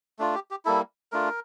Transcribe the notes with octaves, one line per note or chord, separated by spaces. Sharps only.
A3 D4 F4
G4
G4
G3 A#3 E4 A4
A3 D4 F4 A#4